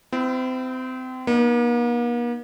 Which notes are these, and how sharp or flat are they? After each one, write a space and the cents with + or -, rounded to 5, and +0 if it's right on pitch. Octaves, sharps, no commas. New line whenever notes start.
C4 -30 E4 +30
A#3 +45 D#4 -10